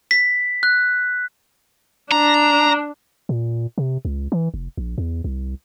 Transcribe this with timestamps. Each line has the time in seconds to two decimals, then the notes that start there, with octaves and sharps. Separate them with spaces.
0.11 B6
0.63 F#6
2.12 D4 A#5
3.29 A#2
3.78 C3
4.05 C#2
4.32 E3
4.54 F1
4.78 A#1
4.98 E2
5.24 C2